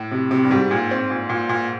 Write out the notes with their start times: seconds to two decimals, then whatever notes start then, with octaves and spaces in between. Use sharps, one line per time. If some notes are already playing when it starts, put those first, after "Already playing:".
Already playing: A2
0.11 C3
0.31 C3
0.43 G2
0.51 G#2 G3
0.71 A#2
0.91 C4
1.10 A#2
1.29 A#2
1.49 A#2